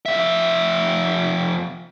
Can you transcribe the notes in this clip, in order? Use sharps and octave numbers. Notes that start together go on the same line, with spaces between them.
F2 E5